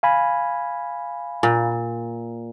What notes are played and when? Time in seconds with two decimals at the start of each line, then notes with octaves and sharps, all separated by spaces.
0.03 F5 G#5 B5
1.43 A#2